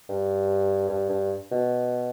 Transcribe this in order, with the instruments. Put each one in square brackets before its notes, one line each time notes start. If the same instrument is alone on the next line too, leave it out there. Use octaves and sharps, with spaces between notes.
[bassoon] G2
G2
G2
B2